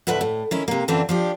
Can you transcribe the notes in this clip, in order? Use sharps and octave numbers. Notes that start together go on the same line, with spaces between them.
D2 A2 B4 E5 F#5
A2
D#3 C#4 E4
C3 A#3
F#2 D3 E3 C4 D4 F4
F3 D4 G4